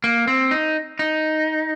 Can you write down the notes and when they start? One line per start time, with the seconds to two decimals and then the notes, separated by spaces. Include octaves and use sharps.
0.04 A#3
0.27 C4
0.51 D#4
0.99 D#4